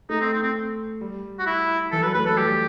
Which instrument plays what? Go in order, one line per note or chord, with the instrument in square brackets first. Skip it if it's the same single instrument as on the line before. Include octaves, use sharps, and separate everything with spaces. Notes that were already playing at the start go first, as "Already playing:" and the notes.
[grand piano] A3 [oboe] D#4
[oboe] C4
C4
C4
[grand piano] G3
[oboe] F#4
E4
[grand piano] E3 [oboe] A4
[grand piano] F#3 [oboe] B4
[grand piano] A3 [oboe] B4
[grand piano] A3 [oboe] A4
[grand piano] G3 [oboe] G4